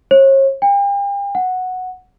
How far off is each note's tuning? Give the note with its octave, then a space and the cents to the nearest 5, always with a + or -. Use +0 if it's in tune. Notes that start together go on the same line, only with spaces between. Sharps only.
C#5 -40
G5 +40
F#5 -5